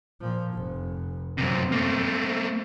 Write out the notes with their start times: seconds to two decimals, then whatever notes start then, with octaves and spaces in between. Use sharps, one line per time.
0.20 A#2 F3
0.53 F1
1.38 F#2 C3 C4
1.72 A3 A#3